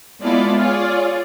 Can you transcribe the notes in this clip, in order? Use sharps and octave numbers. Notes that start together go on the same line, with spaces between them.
G#3 B3 E4 F4 A4 D5
F4 G#4 C#5 D5